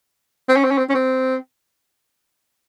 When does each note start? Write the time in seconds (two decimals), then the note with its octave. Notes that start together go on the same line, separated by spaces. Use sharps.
0.49 C4
0.56 C#4
0.64 C4
0.71 C#4
0.78 C4
0.89 C#4
0.95 C4